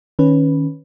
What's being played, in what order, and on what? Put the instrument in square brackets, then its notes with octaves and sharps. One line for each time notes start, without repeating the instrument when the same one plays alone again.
[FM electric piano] D#3 C#4 B4